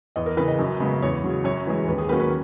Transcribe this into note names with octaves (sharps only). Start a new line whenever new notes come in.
E2 D#5
A#4
C#3 E3 B4
D#5
F#2
C#3 G#3 B3
E2 C#5
C#3 F#3
F#2 C#5
E3 G#3
D#2 B4
G#4
D#3 F#3 A#3 C#4 B4
B4